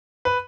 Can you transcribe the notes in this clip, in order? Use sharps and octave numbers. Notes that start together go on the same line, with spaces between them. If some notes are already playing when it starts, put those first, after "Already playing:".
B4